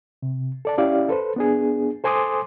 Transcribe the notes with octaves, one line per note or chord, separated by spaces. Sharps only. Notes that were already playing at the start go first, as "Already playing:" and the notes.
C3
A4 D5 A5
C#4 E4 G4 D5 F5
A4 B4 C5
B3 D4 G#4
A4 C5 G#5 C6 D6 D#6